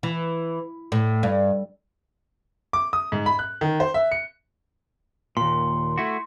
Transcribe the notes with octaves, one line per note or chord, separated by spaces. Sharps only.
E3
A2
G2
D6
D#6
G#2
B5
F#6
D#3
C5
E5
C#7
D#2 A#2 C6
A3 E4 F#4